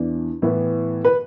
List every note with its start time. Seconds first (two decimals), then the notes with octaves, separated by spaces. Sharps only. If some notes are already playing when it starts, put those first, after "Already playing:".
Already playing: E2 E3 D4
0.42 A2 E3 B3 E4
1.05 B4